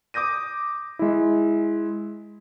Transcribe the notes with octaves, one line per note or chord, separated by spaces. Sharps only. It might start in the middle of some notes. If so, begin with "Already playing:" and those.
D6 D#6 G6 A#6 D#7
G#3 E4